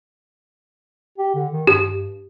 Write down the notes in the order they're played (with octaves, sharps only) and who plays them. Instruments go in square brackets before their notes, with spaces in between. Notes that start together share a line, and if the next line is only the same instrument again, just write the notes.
[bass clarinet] G4
D3
D#3
[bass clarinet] G2 [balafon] G4